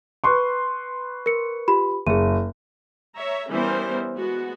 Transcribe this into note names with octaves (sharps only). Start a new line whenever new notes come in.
B4 C6 C#6
A#4 C#7
F4 G4 B5
F#1 G#4 D#7
C#5 E5 A#5
E3 G3 B3 C#4 A#4 C5
G#3 B3 F#4